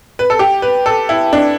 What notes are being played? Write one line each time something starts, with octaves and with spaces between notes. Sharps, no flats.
B4
A4
G4
B4
A4
E4
D4